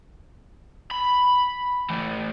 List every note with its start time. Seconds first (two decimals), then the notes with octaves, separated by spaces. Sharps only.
0.91 B5
1.90 A2 E3